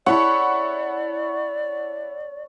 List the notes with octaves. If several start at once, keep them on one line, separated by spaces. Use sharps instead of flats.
E4 C#5 D5 F#5 A5 B5